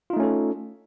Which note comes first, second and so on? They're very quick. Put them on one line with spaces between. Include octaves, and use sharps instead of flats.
F4 D#4 A3 C#4 A4